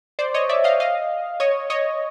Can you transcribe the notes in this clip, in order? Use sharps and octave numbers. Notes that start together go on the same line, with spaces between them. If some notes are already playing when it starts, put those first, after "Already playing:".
C5 D5
C#5 D#5
D5 E5
D#5 F5
D#5 F5
C#5 D#5
C#5 D#5